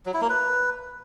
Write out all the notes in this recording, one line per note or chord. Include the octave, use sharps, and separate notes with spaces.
F#3
E4
A#3
B4